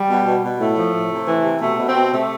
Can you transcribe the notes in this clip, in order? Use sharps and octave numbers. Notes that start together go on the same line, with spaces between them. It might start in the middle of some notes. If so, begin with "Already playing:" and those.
Already playing: G3
B2
B2
B2
A2 A3
F3
A2
C3
E3
C3
B2 A3
B2
C4
B2
C3 A3